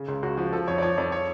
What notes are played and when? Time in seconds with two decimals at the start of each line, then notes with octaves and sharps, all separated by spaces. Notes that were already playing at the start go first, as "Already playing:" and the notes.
Already playing: C#3
0.08 C#2
0.23 C#2 F#4
0.37 F3 F#4
0.53 F3 A4
0.68 F2 C#5
0.78 D5
0.82 F3 C#5
0.98 F2 D5
1.12 C#5